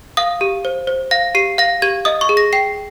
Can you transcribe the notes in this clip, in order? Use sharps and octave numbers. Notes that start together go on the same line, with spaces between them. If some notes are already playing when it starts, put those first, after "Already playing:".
F5 D#6
G4
C5
C5
F5 A#6
G4 C7
F5 A#6
G4 G#6
D#5 D#6
C#6
G#4
A#6
G5 C7